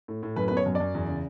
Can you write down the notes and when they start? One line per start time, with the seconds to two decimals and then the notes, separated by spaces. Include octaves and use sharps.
0.08 A2
0.23 A2
0.36 F#2 B4
0.48 B3 B4
0.57 C#5
0.66 F#2
0.75 D5
0.80 F#2
0.95 E2
1.09 C#3